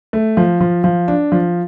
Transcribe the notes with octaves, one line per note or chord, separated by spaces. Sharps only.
A3
F3
F3
F3
D4
F3